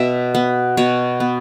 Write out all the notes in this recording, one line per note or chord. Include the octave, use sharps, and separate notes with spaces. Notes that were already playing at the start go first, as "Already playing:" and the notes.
Already playing: B2 E5
B3
B2 C#5
B3